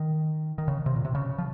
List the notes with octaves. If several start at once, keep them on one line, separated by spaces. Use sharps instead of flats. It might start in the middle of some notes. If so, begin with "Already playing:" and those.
Already playing: D#3
D#3
C#3
C3
A#2
C3
C#3
F3